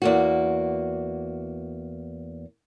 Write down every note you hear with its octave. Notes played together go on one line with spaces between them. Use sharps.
E2 A#3 F#4